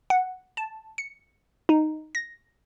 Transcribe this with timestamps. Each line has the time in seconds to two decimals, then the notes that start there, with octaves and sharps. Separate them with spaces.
0.10 F#5
0.57 A5
0.98 C#7
1.69 D#4
2.15 A#6